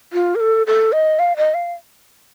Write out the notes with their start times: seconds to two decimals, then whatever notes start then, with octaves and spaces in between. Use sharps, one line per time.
0.13 F4
0.35 A#4
0.40 A4
0.67 A4
0.92 D#5
1.19 F5
1.37 D#5
1.54 F5